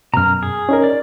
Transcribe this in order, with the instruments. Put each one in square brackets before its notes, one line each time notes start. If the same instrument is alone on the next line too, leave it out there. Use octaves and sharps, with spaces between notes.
[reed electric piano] F#2 B2 [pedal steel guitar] A#5 F6
[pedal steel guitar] G#4
[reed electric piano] C#4 D#4 A#4
[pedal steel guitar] D5